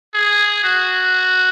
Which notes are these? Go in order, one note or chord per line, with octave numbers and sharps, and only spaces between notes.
G#4
F#4